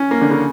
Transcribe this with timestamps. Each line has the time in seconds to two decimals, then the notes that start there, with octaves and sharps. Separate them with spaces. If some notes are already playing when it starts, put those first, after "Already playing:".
Already playing: C#4
0.11 A#3
0.21 D3
0.31 C#3